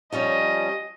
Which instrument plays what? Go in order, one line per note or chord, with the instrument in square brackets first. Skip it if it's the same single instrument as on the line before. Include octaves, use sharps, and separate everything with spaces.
[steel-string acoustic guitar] F3 G3 C#4 [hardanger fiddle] D#5